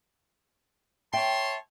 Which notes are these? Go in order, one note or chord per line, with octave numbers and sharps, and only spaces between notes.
C#5 E5 G5 A5 C6